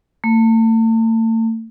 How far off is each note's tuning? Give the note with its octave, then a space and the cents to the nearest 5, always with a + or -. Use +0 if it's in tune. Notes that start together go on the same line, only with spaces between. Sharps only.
A3 +40